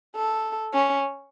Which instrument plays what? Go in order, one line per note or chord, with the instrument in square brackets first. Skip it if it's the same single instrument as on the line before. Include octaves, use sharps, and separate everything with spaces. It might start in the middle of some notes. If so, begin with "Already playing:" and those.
[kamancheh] A4
C#4